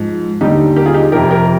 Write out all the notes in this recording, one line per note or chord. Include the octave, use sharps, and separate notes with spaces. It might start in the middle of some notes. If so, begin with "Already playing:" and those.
Already playing: G#2 F3
D#2 D3 G3 D#4 G4
G4 A#4
F4 G#4
D#4 G4
F2 C3 F3 G4 A#4
G4 A#4